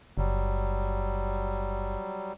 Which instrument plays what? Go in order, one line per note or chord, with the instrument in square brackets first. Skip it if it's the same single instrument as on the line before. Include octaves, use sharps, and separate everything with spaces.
[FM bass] F#1 [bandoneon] F#3 G3